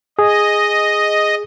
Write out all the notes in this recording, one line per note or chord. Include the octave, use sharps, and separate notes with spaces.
G#4 D#5